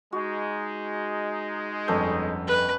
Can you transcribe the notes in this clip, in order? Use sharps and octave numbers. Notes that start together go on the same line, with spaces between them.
G#3 D#4 F#4
G1 F2 B3 C#4 A4 G6
B4